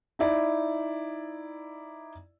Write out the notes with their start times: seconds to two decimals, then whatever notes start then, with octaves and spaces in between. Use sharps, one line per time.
0.19 D#4 E4 D5